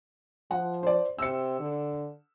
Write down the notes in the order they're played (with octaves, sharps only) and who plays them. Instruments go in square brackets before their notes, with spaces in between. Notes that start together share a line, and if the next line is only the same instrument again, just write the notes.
[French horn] F3 [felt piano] F#5
[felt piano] C5 D5
[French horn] C3 [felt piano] E6 C#7
[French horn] D3